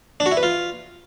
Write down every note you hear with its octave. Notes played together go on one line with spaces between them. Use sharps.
D4
F#4
E4
B4
F4